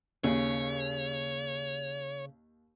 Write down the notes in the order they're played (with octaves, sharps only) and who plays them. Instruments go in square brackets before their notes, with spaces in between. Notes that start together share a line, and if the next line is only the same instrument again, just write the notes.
[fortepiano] D#2 [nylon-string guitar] C#3 G#4 [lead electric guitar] C#5